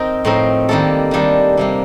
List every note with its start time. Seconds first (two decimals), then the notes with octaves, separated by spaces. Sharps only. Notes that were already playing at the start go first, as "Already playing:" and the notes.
Already playing: C4 D#4 A#4
0.25 A2 F3 C4 D#4 A#4
0.69 D#3 G3 A#3 D4 A4
1.11 D#3 G3 A#3 D4 A4
1.57 C3 G3 A#3